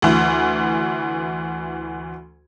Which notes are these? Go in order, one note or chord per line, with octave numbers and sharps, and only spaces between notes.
D2 E3